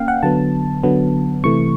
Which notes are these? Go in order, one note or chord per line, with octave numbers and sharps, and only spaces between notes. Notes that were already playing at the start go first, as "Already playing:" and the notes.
Already playing: A#3 C#4 F5 G5
F#5
D3 F#3 B3 A5
D3 F#3 B3
C3 E3 A3 C#6